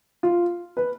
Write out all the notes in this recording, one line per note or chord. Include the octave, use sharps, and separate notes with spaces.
F4
B4